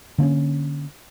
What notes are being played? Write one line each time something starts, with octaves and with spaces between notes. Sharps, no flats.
D3 A#3 C4 C#4